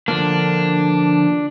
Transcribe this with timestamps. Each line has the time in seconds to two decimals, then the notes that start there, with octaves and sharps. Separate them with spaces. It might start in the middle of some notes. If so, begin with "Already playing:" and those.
0.08 D3 F3 A#3 D4